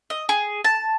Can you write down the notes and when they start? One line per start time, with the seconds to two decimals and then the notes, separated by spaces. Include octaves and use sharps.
0.10 D#5
0.29 G#4
0.64 A5